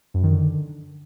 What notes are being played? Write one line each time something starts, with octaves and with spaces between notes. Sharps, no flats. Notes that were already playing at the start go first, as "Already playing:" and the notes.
F#2
D#3
D3